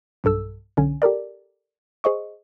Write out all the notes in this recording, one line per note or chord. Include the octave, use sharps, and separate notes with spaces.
B1 G2 A4 E6
B1 D3 C#4 G#5
G4 A4 A#4 D5
G#4 C5 D#5 C#6